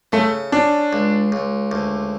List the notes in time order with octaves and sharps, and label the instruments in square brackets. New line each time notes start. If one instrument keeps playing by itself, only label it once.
[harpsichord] C#3 [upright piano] A3
[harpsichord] C#4 [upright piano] D4
[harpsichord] C#2
C#2
D2